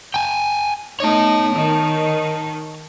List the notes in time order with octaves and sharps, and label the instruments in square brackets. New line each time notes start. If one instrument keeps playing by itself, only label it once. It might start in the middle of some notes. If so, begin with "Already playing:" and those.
[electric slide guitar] G5 G#5
[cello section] A3 B3 D#4 [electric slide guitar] C#5 A5
[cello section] D#3 D#4